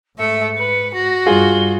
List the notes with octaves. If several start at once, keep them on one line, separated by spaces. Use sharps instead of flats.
G#2 A3 E5 C#7
B4
F#4 A#6
G2 G3 F4 G#4 G7